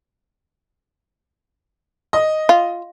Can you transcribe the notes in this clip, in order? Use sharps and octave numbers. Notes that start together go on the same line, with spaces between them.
D#5
F4